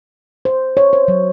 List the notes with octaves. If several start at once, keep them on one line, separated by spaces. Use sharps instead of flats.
C5
C#5
C5
F#3